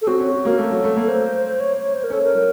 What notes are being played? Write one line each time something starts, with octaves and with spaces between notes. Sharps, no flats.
A4
C4 F#4
C#4
C#4
A#3 A#4
A3 A4
F#3
A3
A#3
C5
C#5
C#5
C5
A#4
C#4 A4
A#4
F#3